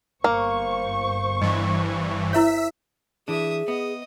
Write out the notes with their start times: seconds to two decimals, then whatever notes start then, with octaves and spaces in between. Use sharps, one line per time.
0.24 G1 A#3 C5 C#6
1.42 G2 E3 D#5
2.33 E4 B4 C#5 E5 B6
3.28 E3 D4 G#4 E5 D#6
3.68 B3 D#5